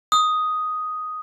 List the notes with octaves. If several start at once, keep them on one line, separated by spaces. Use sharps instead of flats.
D#6